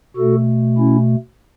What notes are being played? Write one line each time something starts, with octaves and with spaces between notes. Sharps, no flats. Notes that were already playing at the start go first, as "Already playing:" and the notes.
B2 A3 F#4 A4
C#4 E4